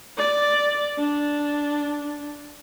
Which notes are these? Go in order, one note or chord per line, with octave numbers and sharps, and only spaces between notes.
D5
D4